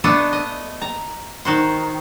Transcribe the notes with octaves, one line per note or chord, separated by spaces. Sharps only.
A3 B3 D4 D#5 E5
D#5
A#5
D#3 F#4 C5